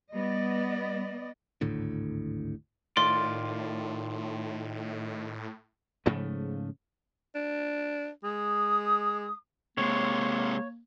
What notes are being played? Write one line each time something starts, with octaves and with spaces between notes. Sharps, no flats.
G3 B3 D5 D#5
G#1 D2 A2 D3
A2 D#3 F4 D5 C6
G#2 C#3 F3 A3
D4
G#3 D#6
C3 G#3 A#3 C#5